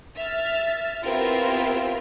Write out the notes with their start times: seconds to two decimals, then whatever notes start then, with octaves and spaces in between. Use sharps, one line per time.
0.16 E5 F6 A6
1.04 B3 C4 E4 F4 G4 A#4